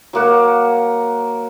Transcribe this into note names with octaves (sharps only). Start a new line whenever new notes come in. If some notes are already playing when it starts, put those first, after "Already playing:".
F#3 A#3 F#5